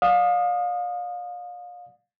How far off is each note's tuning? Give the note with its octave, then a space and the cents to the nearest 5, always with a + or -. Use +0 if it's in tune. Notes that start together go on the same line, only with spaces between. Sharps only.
D5 +0 F5 +30 D#6 -15